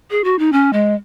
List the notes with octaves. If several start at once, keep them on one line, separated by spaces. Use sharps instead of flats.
G#4
F#4
D#4
C#4
G#3